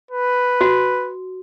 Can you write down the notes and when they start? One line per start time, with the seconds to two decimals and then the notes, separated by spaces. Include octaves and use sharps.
0.11 B4
0.61 F#4